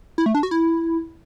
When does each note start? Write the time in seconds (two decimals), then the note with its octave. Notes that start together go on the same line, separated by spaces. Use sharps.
0.18 E4
0.26 A3
0.35 D4
0.43 F#4
0.51 E4